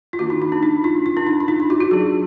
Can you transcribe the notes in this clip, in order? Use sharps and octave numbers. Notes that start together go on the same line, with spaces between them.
F4
D#3 A#3 D4 F#4
D#4
D#4
D4
D#4
F4
F4
D4
D#4
F4
D#4
F4
F#4
F#4
F#3 D4 G#4